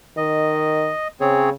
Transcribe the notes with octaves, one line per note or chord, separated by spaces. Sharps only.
D#3 D#5
C#3 C4 G#4 C#5